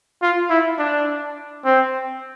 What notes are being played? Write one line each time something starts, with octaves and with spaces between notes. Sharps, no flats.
F4
E4
D4
C4